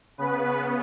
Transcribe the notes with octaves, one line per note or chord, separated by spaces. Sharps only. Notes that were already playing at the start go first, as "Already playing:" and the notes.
C#3 B3 B4